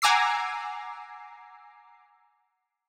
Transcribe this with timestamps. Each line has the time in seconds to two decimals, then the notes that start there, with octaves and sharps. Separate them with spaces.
0.02 F#5 G#5 A#5 D6 E6 C7